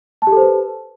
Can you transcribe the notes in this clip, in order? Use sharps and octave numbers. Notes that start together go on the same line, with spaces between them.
G4 A4 B4 C5 A5